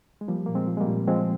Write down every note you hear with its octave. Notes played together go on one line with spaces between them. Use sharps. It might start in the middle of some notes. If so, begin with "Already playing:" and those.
G#3
F3 G3 A#3
A#2 A#3
G#3 C4
F3
G#3
G3 A#3
A#2
F3 G#3 C4